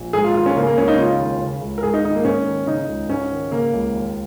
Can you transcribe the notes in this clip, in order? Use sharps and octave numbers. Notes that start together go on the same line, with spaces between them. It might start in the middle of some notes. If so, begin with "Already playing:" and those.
Already playing: A#1
G#2 G#4
F4
D#3 F4
C#4
C#3 A#3
A#3
C#2 C#4
D#4
C#3 F4
D#2
C#3
C#2
A#4
G#2 G#4
D#4
D#3 D#4
A#3
G#2 C#4
D#3
C#3 D#4
C#2
G#2 C#4
D#3
C#3 A#3
C#2
D#2